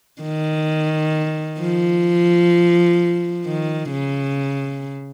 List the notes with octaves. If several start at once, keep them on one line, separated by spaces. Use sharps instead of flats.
D#3
F3
D#3
C#3